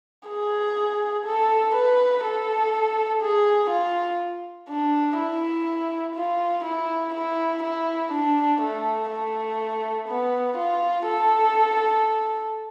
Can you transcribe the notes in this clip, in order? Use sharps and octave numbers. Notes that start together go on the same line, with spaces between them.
G#4
A4
B4
A4
G#4
F4
D4
E4
F4
E4
E4
E4
D4
A3
A3
B3
F4
A4